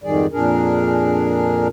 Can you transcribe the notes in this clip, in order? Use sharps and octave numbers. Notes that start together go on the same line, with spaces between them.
F2 G#2 D#3 G3 G#4 D5
F2 A#2 D4 G#4 A#4